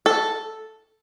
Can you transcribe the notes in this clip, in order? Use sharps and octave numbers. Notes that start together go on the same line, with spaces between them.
A4